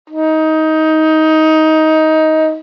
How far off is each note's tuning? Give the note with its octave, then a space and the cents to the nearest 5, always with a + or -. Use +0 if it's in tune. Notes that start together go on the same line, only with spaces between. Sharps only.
D#4 +15